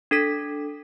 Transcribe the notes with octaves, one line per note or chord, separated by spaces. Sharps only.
D4 A4 B6